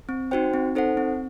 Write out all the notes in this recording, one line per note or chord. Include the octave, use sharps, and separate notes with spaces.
C4
D#4 F#4 C5 G5
C4
D#4 A4 C5 F#5
C4